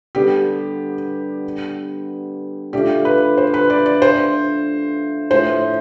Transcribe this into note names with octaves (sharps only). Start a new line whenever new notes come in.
D3 G3 B3 G4
D3 A3 D4 F4 G4
B4
C5
B4
D5
D5
C5
A2 F3 A3 C5